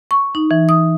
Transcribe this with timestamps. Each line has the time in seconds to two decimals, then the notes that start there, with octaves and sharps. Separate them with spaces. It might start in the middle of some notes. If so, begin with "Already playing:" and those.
0.11 C#6
0.35 D#4
0.51 E3
0.69 D#6